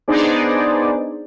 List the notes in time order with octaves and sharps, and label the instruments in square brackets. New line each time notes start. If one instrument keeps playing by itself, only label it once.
[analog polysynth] B3 D4 D#4 G#4 C5 D5